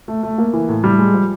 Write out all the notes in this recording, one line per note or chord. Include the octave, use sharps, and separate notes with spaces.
A3
A3
A#3
E3
A2
G3
G#3
F3